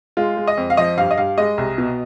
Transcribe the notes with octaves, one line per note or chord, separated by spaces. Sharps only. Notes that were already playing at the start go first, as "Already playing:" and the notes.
G#3 F4
G#3
D#5
F2
F5
F3 D#5
G2 F5
D#5
G2 F5
G#3 D#5
C2
B2